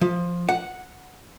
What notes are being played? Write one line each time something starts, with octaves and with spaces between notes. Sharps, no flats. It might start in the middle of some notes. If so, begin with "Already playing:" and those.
F3
F#5